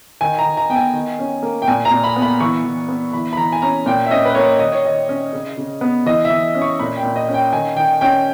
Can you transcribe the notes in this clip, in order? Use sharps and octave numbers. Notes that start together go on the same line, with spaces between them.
D#3 G#5
A#5
D#3
A#5
B3 G5
G#5
D#3
C#4
A#3
G5
A#2 G#5
A#5
A#2
B5
B3
B5
E3 C#6
E3
B3
E3 B5
B5
E3 A#5
G#5
C#4 A#5
A#2 G5
E5
C#4 D#5
B4
A#3 C#5
D#3 D#5
C#5
D#3 D#5
C#4
C#3
C#3
B3
E3 D#5
E5
E3
C#4
C#6
A#2 B5
G5
A#2
D#5
C#4
G5
D#3 G#5
D#3 G5
C#4 G5